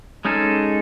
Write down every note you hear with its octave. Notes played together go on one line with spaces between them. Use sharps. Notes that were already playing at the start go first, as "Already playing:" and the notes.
G#3 C#4 D#4 G#4 A4